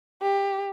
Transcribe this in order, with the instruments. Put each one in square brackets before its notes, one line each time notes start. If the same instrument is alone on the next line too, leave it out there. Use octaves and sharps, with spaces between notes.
[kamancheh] G4